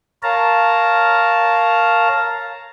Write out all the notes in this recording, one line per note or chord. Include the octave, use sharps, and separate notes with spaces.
A#4 C#5 F5 A5 A#5